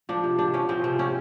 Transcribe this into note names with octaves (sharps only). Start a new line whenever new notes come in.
F3 D4
C3
C3 D4
F3 C#4
F3 C4
C3 C4
C3 C#4